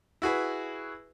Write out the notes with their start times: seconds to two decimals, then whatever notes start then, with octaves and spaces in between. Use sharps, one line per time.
0.22 E4 F#4 G#4 B4